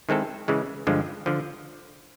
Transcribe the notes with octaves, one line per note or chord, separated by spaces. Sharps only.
D#3 G#3 C4 E4 A4
C#3 E3 G#3
G2 D3 F3 G#3
D3 F3